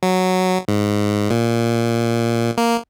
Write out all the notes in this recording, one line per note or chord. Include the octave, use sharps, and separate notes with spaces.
F#3
G#2
A#2
A#3